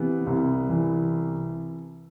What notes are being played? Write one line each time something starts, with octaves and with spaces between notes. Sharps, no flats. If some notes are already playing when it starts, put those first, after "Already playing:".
Already playing: C3 E3 B3
C2
E3